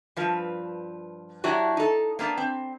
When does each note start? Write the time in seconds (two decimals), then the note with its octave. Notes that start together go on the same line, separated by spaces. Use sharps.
0.16 G2 F3 B4
1.44 F#3 D4 E4 F#4 G4
1.77 D#4 A4
2.19 A#3 B3 D4
2.37 C4